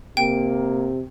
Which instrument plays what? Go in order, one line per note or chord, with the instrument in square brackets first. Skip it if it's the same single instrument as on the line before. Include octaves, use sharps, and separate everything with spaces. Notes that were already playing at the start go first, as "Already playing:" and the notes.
[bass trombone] C3 [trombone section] A#3 [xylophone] G5